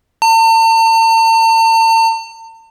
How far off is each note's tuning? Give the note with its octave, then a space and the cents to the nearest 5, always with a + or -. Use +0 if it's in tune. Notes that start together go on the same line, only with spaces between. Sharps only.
A5 +45